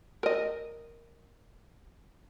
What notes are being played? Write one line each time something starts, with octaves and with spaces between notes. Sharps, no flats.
A#4 D#5